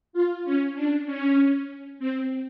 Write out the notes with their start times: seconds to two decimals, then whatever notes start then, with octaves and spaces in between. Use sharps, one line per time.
0.13 F4
0.44 C#4
0.75 D4
1.06 C#4
1.99 C4